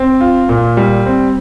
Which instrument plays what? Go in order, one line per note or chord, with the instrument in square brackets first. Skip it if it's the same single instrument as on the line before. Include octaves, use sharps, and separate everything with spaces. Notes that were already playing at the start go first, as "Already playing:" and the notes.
Already playing: [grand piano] C4
F4
A#2
G3
C4